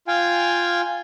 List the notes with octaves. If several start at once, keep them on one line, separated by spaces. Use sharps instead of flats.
F4 F5 G5 G#5